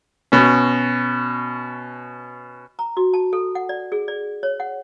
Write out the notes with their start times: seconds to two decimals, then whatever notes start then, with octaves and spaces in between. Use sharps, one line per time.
0.32 B2 C#4
2.79 A#5
2.97 F#4
3.13 A5
3.33 A4
3.55 F#5
3.69 D5
3.92 G#4
4.08 D5
4.43 C#5
4.60 F#5